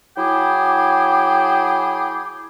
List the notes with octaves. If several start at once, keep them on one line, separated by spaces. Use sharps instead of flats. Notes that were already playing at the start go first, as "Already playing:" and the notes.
F#3 E4 G#4 G5 D6